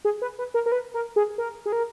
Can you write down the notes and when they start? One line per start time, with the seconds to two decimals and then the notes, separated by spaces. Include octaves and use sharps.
0.05 G#4
0.22 B4
0.39 B4
0.54 A#4
0.66 A#4
0.72 B4
0.94 A#4
1.16 G#4
1.38 A#4
1.66 G#4
1.72 A#4